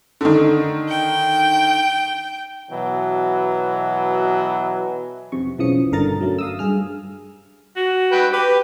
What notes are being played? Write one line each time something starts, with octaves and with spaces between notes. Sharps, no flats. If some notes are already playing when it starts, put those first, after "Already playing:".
D3 D#3
G5
B2 E3 F#3
F2 C3 C#6
B1 C#3 E3 F3 D#6 C#7
G1 D3 A#4 A#5 A6
F#2 F#3 A3
F5 D#6 E6
G2 G#4 F6
F#4
B4 G5
G4 B4